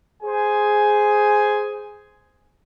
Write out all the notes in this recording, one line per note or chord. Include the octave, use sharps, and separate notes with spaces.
G#4 C5 G#5